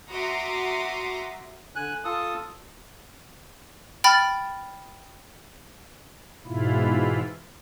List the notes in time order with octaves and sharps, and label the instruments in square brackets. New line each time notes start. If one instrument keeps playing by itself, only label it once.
[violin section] F#4 E5 A#5 C6 D6 D#6
[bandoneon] D3 G#5 F#6
F4 A4 A5 D#6
[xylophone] G5 B5 F6 A6
[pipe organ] G#2 B2 E3 E4 F4